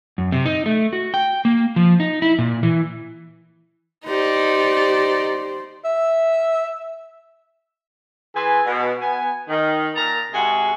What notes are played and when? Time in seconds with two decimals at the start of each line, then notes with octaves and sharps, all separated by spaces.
0.18 F#2
0.32 C3
0.45 D#4
0.66 A3
0.93 F#4
1.14 G5
1.45 A#3
1.76 F3
2.00 D#4
2.22 E4
2.39 A#2
2.63 E3
4.06 D#4 G4 C5 D5
5.85 E5
8.35 E3 G#4 B4 G#5 C6
8.66 B2
9.00 B3 G#5
9.48 D#3
9.95 A#2 A#4 A5 A#5
10.32 G#2 C3 G#3 F#4 G#5